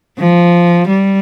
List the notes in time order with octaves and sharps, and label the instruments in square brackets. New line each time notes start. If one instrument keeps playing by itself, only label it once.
[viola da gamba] F3
G3